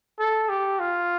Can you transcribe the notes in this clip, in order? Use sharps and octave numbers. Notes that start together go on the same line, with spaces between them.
A4
G4
F4